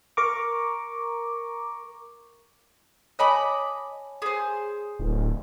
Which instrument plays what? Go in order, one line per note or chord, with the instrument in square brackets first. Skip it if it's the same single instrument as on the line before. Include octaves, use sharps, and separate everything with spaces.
[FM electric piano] A#4 A#5 C#6 D6
[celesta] C#5 G#5 A5 [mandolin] D#5 B5 D6
[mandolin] G#4 C5
[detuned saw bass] D1